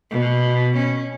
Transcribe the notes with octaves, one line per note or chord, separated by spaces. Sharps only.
B2
C#4